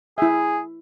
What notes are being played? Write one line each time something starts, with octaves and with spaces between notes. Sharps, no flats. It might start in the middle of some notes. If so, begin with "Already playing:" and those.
E4 G#4 E5